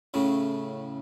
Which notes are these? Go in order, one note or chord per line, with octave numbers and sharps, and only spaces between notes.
A2 C#3